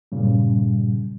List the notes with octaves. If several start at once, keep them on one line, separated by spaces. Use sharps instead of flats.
G2 A#2 C#3 G3